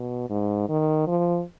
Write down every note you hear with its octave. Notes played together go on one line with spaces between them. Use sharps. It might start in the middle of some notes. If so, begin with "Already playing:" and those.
Already playing: B2
G#2
D#3
F3